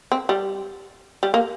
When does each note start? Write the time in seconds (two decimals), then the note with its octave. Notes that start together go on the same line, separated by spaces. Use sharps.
0.12 C4
0.29 G3
1.23 G3
1.34 A#3